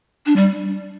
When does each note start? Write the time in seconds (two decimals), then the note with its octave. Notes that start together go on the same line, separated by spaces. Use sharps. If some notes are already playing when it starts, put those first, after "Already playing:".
0.26 D4
0.36 G3